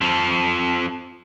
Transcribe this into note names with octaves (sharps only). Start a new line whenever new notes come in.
F2 F3